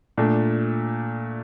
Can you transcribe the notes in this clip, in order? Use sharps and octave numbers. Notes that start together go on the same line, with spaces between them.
A#2 A3 D4 A4